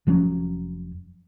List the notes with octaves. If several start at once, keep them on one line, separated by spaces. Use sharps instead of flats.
F1 F3 F#3 C#4